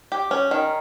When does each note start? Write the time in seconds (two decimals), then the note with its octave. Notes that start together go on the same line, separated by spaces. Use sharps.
0.12 G4
0.31 C#4
0.51 D#3